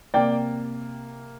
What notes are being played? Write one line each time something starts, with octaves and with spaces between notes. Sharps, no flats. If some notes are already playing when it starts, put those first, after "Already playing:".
C3 A#3 D5 G5